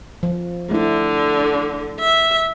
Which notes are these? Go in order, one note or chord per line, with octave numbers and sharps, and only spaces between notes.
F3
D3 A3 E4
E5